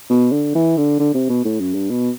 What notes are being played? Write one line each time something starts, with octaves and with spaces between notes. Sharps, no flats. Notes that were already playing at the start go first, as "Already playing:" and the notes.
B2
D3
E3
D3
D3
C3
B2
A2
F#2
G2
B2